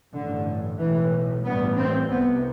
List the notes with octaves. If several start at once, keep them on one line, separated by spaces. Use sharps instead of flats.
A1 G2 D3
B1 A2 E3
A1 G2 B3
C4
C2 C3 B3